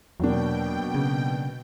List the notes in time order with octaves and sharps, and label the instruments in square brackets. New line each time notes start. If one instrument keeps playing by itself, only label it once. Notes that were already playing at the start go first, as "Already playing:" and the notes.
[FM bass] E2 [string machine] B2 G5 [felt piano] F#3 A#3 D4
[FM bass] C#3